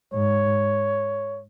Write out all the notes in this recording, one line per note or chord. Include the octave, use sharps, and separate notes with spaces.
G#2 C#5